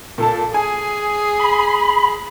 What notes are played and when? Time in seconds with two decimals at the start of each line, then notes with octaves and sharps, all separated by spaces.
0.18 A#2 A4 A5
0.54 G#4 G#5
1.40 B5